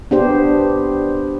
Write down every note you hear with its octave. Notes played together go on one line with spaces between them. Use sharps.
B3 D4 G4 C5